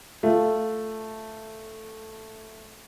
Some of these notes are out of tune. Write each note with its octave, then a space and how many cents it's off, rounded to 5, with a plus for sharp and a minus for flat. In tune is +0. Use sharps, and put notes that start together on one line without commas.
A3 +0 F4 +0